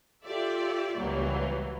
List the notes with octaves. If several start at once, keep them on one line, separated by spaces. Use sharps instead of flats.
F4 G4 A4 D5 E5
C#2 B2 E3 F#3 G3 A#3